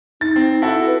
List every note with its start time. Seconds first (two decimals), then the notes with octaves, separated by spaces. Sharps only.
0.21 D#4 A6
0.36 C4
0.62 E4 F#4 A4
0.87 B4